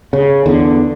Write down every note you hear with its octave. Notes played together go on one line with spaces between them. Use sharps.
C#3
E2 D3